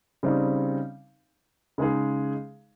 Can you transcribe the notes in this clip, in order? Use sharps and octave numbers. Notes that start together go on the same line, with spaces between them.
C#3 G3 C4 D#4
C#3 G#3 D#4 G#4